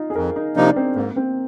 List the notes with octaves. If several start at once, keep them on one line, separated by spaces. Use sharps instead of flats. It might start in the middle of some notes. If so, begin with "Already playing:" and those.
Already playing: D#4 F4
G#4
F2 A#4
D#4
C3 F3 A#3 D4 D#4
D4
C4
G#2 A#3
C4